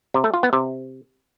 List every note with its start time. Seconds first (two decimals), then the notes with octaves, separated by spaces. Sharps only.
0.14 C3
0.24 A3
0.34 F4
0.43 B3
0.53 C3